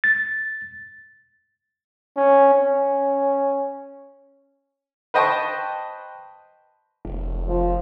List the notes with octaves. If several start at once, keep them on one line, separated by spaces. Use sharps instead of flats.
A6
C#4
C#4
B4 C5 D#5 G5 A5 C#6
F1
F3